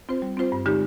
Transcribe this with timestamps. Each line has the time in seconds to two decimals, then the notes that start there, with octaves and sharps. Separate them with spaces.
0.09 C4 F4 C5
0.22 G3
0.37 C4 F4 C5
0.52 G2
0.66 D3 G#3 D#4 G4